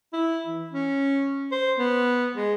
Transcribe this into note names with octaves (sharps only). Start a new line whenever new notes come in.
E4
E3
C#4
C5
B3
G#3